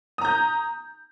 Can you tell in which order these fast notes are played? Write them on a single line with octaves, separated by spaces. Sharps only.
D#6 A#5 G6